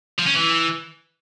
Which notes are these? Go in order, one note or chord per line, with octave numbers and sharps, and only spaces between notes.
F3
C#4
E3